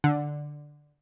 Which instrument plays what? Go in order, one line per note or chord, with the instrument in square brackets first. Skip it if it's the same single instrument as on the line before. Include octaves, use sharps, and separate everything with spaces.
[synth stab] D3